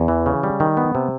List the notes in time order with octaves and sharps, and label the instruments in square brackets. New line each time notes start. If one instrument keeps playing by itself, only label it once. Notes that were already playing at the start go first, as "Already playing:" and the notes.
Already playing: [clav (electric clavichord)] E2
E3
C#3
G3
D#3
B3
C3